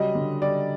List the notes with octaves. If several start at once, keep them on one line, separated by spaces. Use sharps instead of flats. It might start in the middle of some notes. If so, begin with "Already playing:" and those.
Already playing: C#3 F#3 G3 D#5
D3
G3 D5